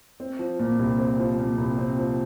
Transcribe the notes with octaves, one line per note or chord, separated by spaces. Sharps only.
C4
F3
A#2
C2
C4
F3
A#2
C2
C4
F3